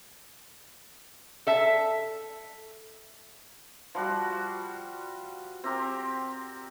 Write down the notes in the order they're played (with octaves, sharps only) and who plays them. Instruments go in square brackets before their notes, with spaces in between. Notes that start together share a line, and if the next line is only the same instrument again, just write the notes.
[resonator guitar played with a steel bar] A4 E5 A5
[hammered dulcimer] F3 G3 F#4 C6
C4 G4 A#4 C6